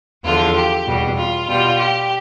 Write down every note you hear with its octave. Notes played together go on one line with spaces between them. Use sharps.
E2 D3 F3 F4
G4
E2 B2 G3
F4
B2 G3 F4
G4